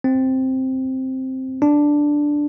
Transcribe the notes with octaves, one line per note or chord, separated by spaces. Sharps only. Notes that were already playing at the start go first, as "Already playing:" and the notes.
C4
D4